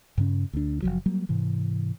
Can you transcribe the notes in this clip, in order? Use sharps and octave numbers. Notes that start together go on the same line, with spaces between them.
G2 C#3 C#4
D2 D4
F#1 D#2 F3 F#3
F#3 G3 A#3
G#2 C3 E3